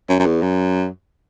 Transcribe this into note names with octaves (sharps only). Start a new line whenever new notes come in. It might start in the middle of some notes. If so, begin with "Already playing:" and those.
F#2
F#2
E2
F#2